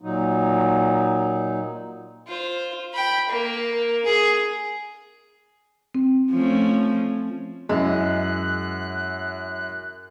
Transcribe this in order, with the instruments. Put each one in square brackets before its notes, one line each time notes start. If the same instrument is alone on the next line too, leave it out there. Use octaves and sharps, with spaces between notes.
[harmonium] A#2 F#3 D#4
[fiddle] F4 C5
G5 B5
A#3
G#4
[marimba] C4
[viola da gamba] F3 A3 C#4
[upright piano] F#2 E4 [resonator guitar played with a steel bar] G#3 [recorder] F#6